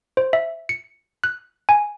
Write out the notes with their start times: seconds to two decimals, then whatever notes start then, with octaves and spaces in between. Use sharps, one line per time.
0.17 C5
0.33 E5
0.69 C#7
1.24 F#6
1.69 G#5